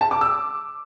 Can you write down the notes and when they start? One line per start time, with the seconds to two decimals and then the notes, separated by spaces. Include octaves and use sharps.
0.01 A5
0.11 D6
0.21 E6